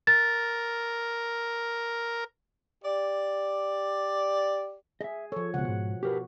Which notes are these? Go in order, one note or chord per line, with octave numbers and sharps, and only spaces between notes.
A#4 A6
G4 D5
G#4 D#5 E5
F3 A4 C#5
C#2 B2 F#5
G#2
F#4 G4 A#4 B4